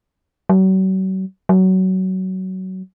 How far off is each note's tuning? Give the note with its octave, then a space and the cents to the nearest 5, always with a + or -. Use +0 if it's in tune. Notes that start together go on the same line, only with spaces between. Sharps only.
F#3 +40
F#3 +20